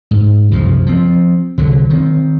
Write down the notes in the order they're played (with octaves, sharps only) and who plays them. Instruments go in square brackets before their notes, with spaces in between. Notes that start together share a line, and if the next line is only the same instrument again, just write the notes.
[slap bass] G#2
C2 F#2 C#3 F3
F3 C4
C2 D3 F#3
D#3 C4